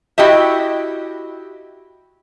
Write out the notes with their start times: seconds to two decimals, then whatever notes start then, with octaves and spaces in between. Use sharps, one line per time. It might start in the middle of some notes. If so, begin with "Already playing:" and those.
0.18 E4 F#4 G4 D#5 E5